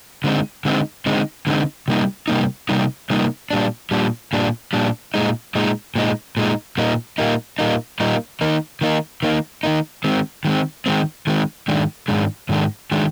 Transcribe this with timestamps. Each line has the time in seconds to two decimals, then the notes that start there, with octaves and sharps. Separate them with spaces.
0.24 D3 G#3 C4 D#4
0.65 D3 G#3 C4 D#4
1.06 D3 G#3 C4 D#4
1.47 D3 G#3 C4 D#4
1.88 C3 G3 A#3 D#4
2.28 C3 G3 A#3 D#4
2.69 C3 G3 A#3 D#4
3.10 C3 G3 A#3 D#4
3.51 A#2 G3 D4
3.91 A#2 G3 D4
4.33 A#2 G3 D4
4.73 A#2 G3 D4
5.14 A#2 G#3 D#4
5.55 A#2 G#3 D#4
5.95 A#2 G#3 D#4
6.37 A#2 G#3 D#4
6.78 A#2 G3 A#3 D#4
7.18 A#2 G3 A#3 D#4
7.59 A#2 G3 A#3 D#4
8.00 A#2 G3 A#3 D#4
8.41 D#3 A#3 D#4
8.81 D#3 A#3 D#4
9.23 D#3 A#3 D#4
9.63 D#3 A#3 D#4
10.04 D#3 G#3 C4
10.45 D#3 G#3 C4
10.86 D#3 G#3 C4
11.27 D#3 G#3 C4
11.68 G#2 D#3 G#3 D4
12.08 G#2 D#3 G#3 D4
12.49 G#2 D#3 G#3 D4
12.91 D#3 G#3 D4